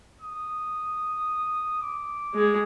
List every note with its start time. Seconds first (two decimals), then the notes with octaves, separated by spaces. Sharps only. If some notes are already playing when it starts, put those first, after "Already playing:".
0.21 D#6
1.82 D6
2.34 G#3 G#4